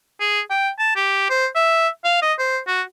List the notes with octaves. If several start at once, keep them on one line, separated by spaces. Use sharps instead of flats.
G#4
G5
A5
G4
C5
E5
F5
D#5
C5
F#4